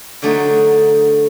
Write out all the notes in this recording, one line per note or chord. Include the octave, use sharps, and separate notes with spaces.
D3 F#3 A3 D4 D#4